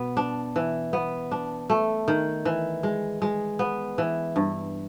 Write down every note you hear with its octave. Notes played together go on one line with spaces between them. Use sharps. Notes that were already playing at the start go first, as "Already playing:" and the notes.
Already playing: B2 B3
D4
E3
B3
D4
A3
D#3
E3
G#3
G#3
B3
E3
G2